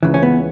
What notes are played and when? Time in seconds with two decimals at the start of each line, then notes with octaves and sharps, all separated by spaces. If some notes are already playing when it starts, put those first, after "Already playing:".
0.03 C#2 C#3 E3
0.14 C#4
0.23 B3